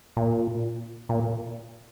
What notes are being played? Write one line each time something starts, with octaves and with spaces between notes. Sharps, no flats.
A#2
A#2